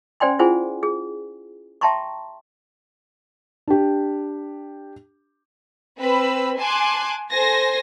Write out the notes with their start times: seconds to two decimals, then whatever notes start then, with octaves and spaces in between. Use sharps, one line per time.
0.20 C#4 C5 D5 G5 G#5 C6
0.39 E4 F4 G#4 C5 F#5 G#5
0.83 G#4
1.81 E5 G5 A5 A#5 C6 C#6
3.68 D4 G4
5.98 C4 B4 B5 E6
6.58 G#5 A5 C6 D6 F#6
7.31 A4 C5 G#5 C6 A#6